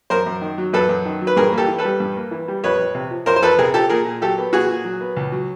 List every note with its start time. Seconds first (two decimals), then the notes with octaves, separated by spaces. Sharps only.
0.10 F#2 A#4 C5
0.26 F#2
0.41 D#3
0.58 F#3
0.73 F#2 A4 B4
0.89 F#2
1.05 D#3
1.22 F#3
1.27 B4
1.36 G2 G#4 A#4
1.52 A#3
1.58 G4 A4
1.68 E3
1.78 A4 B4
1.85 G3
2.00 G2
2.17 A#3
2.31 E3
2.48 G3
2.64 F2 B4 C#5
2.79 F2
2.95 C3
3.11 F3
3.26 F2 A#4 C5
3.36 C5
3.42 F2 A4 B4
3.58 C3 G#4 A#4
3.74 F3 G4 A4
3.89 A#2 G#4 A#4
4.05 A#2
4.22 F#3 G4 A4
4.38 B3
4.53 A#2 F#4 G#4
4.69 A#2
4.85 F#3
5.01 B3
5.16 C#2
5.32 F#3